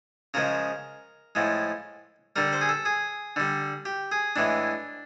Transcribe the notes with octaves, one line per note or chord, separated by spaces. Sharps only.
C#3 F3 G#3 A#4
A2 F3 G#3
D3 G3 A#4
C5
G#4
A4
G#4
D3 G3
G4
G#4
A2 E3 G#3 D4